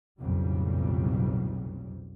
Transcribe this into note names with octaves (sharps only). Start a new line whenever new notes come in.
B1 F2 A2 C#3 G3